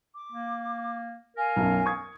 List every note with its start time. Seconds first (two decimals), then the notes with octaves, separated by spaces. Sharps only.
0.13 D6
0.32 A#3
1.37 A#4 F5 G#5
1.56 B1 F#2
1.86 C#6 D#6 G#6